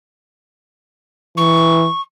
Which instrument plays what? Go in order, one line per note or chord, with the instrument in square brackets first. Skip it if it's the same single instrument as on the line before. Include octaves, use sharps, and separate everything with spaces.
[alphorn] E3 [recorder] C#6